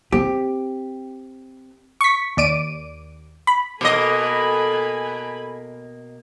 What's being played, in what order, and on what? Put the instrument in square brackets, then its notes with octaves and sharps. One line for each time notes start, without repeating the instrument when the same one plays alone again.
[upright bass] C4 [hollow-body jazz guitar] G4
[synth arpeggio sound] C#6 B6
D#2 D5 D7 D#7
B5
[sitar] B2 A#3 D#5 [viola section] A4 G#5 B5